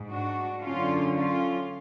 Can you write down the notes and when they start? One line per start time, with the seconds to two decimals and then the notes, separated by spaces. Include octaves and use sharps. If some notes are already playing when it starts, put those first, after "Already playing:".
Already playing: G#2
0.09 D4 F#4
0.62 F#2 D3 C#4 F4
1.15 C#4 F4